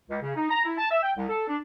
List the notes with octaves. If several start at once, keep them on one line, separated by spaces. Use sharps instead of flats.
C#2
C#3
D#4
A#5
E4
A5
E5
G5
C2
A4
D4